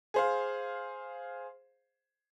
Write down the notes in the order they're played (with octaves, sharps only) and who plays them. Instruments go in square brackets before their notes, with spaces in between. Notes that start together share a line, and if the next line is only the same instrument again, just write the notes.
[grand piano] G#4 C5 F5